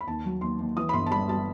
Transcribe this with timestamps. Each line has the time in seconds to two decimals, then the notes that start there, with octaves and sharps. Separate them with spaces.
0.01 B5
0.07 D#2 A5
0.25 F#3
0.41 D#2 C6
0.59 D#2
0.77 E3 D#6
0.89 B5
0.93 G1 C6
1.06 A5
1.11 G3 B5
1.28 G3 A5